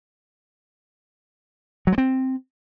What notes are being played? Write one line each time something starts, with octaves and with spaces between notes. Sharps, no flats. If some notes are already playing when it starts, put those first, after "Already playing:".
F#3
G#3
C4